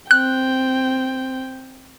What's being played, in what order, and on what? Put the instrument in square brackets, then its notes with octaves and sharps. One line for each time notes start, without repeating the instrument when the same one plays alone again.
[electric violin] C4 G5 [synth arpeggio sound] F#6